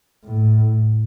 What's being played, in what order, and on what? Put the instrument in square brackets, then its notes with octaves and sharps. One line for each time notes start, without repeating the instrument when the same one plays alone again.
[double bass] A2